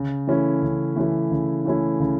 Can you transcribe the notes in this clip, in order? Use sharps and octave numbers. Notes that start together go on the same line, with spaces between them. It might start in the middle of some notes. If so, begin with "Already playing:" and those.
Already playing: C#3
E3 A3 C#4 E4
C#3
E3 A3 C#4 E4
C#3
E3 A3 C#4 E4
C#3